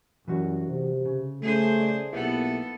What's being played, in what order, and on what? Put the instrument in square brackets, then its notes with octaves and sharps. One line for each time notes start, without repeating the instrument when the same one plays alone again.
[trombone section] F#2 [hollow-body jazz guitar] E3 G3 F#4
[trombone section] C3
[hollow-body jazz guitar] C#3
[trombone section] C#3 A3 [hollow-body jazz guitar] G3 [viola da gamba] G#4 C5
[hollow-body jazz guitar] D5
[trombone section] B1 A#3 E4 [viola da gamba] B3 A4 [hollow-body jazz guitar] G4 B4 E5